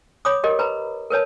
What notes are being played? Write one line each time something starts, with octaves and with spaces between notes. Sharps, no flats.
C#5 B5 D6 D#6
G4 A#4 D#5
B4 A#5 B5
A#4 B4 C#5 A5